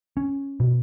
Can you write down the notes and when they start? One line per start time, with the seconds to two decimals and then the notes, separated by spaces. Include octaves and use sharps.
0.17 C#4
0.60 B2